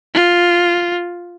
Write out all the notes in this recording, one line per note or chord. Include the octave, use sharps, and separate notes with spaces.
F4